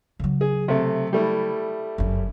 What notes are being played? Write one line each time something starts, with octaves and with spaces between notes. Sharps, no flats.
C#3 F#3
G#4
C3 A3
G3 A3 E4
G1 F#2